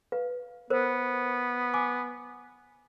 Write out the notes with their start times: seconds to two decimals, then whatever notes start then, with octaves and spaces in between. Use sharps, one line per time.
0.12 B4 F5
0.70 B3 A#4 C5
1.74 G#5 D6